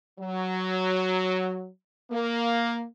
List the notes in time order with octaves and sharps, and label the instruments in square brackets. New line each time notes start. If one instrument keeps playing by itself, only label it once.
[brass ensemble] F#3
A#3